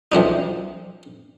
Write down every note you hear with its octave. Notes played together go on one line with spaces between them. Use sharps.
B1 F3 D4 D#4